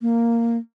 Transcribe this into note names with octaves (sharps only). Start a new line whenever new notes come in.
A#3